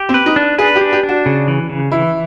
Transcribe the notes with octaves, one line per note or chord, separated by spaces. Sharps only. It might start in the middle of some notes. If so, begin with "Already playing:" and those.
Already playing: G4
C4
B4
D#4
D4
G#4 B4
G4
D4
G4
D4
F#4
C#3
E3
C#3
E3 E4